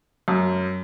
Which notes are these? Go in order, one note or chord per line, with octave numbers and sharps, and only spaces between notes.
F#2